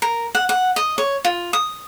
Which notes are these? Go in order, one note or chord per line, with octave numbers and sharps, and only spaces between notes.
A#4
F#5
F#5
D#5
C#5
F4
D#6